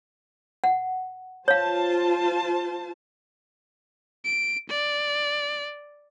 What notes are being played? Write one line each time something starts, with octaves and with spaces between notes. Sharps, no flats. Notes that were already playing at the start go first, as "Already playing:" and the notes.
F#5
F4 C5 C#5 F5 A5
D7
D5